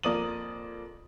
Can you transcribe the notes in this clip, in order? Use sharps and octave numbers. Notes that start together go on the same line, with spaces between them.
F2 A#3 D5 D#6 D#7 F#7